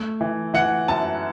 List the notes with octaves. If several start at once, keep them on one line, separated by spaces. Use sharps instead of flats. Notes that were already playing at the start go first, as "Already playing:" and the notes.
Already playing: A3
E3
E3 F#5
F#2 A5